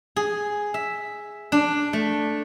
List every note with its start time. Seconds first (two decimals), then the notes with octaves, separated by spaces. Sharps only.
0.16 G#4
0.74 E5
1.52 D4
1.93 A3